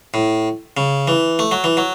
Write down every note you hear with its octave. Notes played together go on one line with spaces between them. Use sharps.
A2
C#3
E3
A3
F#3
E3
F#3